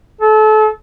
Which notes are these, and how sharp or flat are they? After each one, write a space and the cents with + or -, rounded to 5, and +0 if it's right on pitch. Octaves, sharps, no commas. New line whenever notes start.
A4 -30